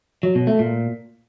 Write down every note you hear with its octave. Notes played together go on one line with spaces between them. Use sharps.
F#3
B2
A3
A#2